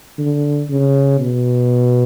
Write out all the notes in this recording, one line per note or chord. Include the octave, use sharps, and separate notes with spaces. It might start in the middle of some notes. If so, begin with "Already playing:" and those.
D3
C#3
B2